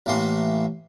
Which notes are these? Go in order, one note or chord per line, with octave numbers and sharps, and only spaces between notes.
A1 A2 E3 A#3 C6